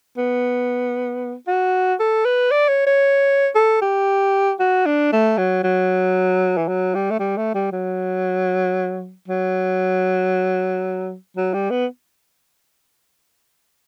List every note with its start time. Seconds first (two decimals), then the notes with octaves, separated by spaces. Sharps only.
0.18 B3
1.48 F#4
2.00 A4
2.25 B4
2.51 D5
2.69 C#5
2.87 C#5
3.55 A4
3.82 G4
4.60 F#4
4.86 D4
5.13 A3
5.38 F#3
5.64 F#3
6.57 E3
6.68 F#3
6.95 G3
7.11 A3
7.20 G3
7.37 A3
7.54 G3
7.72 F#3
9.28 F#3
11.37 F#3
11.54 G3
11.71 B3